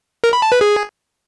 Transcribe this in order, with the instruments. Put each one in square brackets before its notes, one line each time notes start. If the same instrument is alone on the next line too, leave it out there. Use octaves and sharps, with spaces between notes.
[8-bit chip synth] A#4
B5
A5
B4
G#4